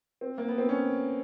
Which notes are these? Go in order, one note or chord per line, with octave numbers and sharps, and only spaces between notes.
C4
A#3
B3
C4
C#4